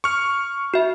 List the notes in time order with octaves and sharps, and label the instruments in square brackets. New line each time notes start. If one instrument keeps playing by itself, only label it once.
[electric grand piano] C#6 F6
[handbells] F#4 E5